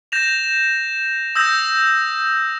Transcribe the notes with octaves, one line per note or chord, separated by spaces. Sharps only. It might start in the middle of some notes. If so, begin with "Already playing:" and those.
G6 A#6 E7 F7
D#6 E6 G6 A#6